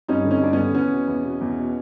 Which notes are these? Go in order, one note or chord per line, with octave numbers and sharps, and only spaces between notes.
G2 C#4 D#4
D3
C#4 D#4
G2 D4
B3 C#4
D3
E2 B3 C#4
B2
E2
B2
E2
B2